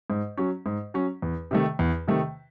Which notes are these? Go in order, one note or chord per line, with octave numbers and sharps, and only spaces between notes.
G#2
F#3 C#4
G#2
F#3 C#4
E2
C3 D#3 A3
E2
C3 D#3 A3